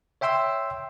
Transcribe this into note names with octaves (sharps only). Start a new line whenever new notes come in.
C#5 E5 G5 C6 E6